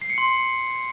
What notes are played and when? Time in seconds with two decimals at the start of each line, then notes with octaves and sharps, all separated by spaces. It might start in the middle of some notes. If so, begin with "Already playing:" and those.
0.02 C7
0.10 C#7
0.18 C6